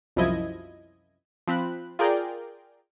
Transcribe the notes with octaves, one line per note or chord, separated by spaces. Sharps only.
C2 F#2 F3 E4 D#5 G#6
F3 C4 B5 F#6
F4 G#4 A#4 D5 G5